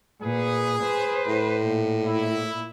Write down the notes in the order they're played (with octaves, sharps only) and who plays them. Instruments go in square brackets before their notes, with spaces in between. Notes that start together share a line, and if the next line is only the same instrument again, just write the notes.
[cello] A#2 B4 [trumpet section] G#4
[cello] B4 C5
[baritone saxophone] A2
[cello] A#2
[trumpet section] E4